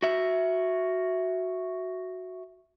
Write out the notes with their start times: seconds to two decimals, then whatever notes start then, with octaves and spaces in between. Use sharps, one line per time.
0.02 F#4 E5